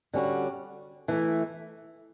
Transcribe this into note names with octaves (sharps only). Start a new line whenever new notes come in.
D3 G3 C#4 F#4
E3 A3 E4